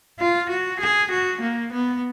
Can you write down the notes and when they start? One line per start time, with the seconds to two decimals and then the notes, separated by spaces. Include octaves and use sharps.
0.20 F4
0.50 F#4
0.80 G#4
1.12 F#4
1.41 A#3
1.72 B3